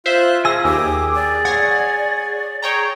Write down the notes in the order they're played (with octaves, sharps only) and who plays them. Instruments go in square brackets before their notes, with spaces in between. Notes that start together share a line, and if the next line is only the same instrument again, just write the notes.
[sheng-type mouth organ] F4 F#6 [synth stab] C5 E5
[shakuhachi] F4 [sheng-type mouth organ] G#4 [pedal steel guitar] G#5 E6 [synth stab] A#6
[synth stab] D#2 [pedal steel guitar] G5 E6 [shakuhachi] D6
[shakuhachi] D5
[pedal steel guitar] C#5 F#5 [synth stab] G#6 A#6 C7
[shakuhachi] G#4 [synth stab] C#5 G5 A#5